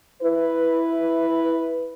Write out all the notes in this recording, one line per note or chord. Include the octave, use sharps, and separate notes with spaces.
E4 B4